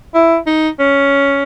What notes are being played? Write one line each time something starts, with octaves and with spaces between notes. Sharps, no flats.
E4
D#4
C#4